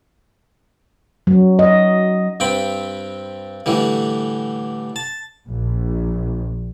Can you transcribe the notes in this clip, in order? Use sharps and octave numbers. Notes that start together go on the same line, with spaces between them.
F#3
D#5
G2 C4 G5 B5
A2 D3 E3 G3
A5
A#1